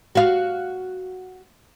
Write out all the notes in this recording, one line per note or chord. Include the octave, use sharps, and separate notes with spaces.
F#4 F5